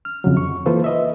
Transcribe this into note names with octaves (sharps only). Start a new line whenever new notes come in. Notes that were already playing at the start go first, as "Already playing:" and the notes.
F6
F2 C#3 F#3
C#6
E3 A#3 F4 A4 B4 C5
B4 D#5 E5